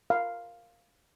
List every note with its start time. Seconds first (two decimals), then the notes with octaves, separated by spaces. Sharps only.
0.10 F5